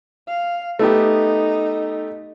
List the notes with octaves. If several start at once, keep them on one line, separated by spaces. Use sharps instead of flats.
F5
A3 B3 D#4 G4